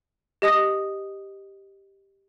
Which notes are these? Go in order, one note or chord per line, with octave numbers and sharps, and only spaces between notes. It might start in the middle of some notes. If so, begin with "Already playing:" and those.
G4 D#5 D#6 A#6